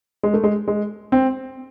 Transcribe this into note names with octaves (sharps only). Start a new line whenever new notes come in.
G#3
A3
G#3
G#3
C4